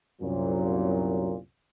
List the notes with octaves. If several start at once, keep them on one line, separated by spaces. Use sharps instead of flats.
C2 F#2 A#2 F#3